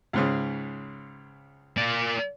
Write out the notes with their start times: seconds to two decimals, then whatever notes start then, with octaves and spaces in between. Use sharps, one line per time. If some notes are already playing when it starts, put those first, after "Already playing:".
0.13 C#2 G#2 C#3
1.77 A#3 D5